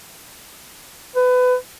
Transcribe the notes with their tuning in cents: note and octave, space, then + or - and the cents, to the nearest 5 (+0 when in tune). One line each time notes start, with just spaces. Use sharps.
B4 +25